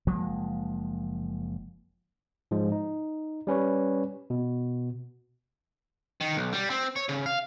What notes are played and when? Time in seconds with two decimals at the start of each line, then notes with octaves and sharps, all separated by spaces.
0.07 F#1 F3 G#3 A#3
2.51 G#2 F3 G#3
2.72 D#4
3.47 G3 C#4 B4 C#5
4.30 B2
6.21 D#3
6.36 B1
6.53 G3
6.70 C4
6.96 C#5
7.09 C#3
7.26 F5